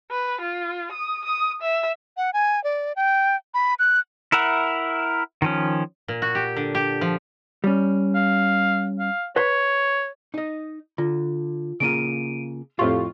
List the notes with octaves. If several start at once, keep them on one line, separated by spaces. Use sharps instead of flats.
B4
F4
D#6
D#6
E5
F#5
G#5
D5
G5
B5
F#6
E4 A#4 E5 F#5
D#3 F3 C#4
A#2
F#4
G4
D3
G4
F3
G3 C#4
F5
F5
B4 C#5 C6
D#4 D#5
D3 F4
C#3 A#3 F4 D7 D#7
F2 A2 F4 G4 C#6